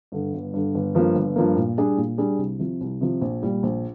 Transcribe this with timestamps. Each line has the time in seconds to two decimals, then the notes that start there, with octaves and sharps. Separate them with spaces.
0.12 G2 D3
0.34 G1
0.54 G2 D3
0.75 G1
0.95 G2 F3 A#3
1.15 G1
1.36 G2 F3 A#3
1.56 A#2
1.78 G3 D4 G#4
1.97 A#2
2.18 G3 D4 G#4
2.38 C2
2.59 C3 F3
2.81 C2
3.01 C3 F3
3.21 A#1
3.43 A#2 G3
3.63 A#1